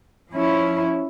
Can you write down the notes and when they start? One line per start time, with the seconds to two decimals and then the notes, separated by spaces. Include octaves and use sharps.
0.30 F3 C#4 E4